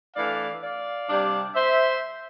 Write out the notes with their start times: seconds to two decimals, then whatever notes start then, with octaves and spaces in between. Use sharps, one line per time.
0.16 E3 A3 D4 D5 F5
0.63 D5 F5
1.09 C3 G3 D4
1.55 C5 E5